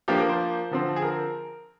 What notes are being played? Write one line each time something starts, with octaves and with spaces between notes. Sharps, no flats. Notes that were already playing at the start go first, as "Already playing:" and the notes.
F3 A#3 D4 G4
A#4
C5
D3 F3 C4
G#4
A#4